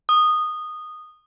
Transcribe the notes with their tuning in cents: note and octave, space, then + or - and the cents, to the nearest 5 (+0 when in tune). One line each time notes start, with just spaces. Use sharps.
D#6 -15